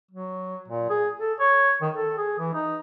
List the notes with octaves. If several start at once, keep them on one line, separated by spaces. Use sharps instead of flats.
F#3
A#2
G#4
A4
C#5
D#3
A4
G#4
E3
D#4